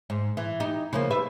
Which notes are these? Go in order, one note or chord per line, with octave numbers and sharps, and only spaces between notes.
G#2
E3
D#4 G4
C#3 F3 A#3
G3 B4 E5